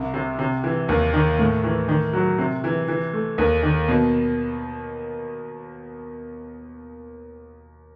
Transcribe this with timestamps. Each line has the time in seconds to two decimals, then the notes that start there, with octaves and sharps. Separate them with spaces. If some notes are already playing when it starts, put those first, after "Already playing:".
Already playing: C2
0.14 C3
0.39 C3
0.64 E3
0.89 D#2
1.14 D#3
1.39 A2
1.64 E3
1.88 D#3
2.13 F#3
2.38 C3
2.64 E3
2.88 E3
3.13 A3
3.38 D#2
3.63 D#3
3.88 B2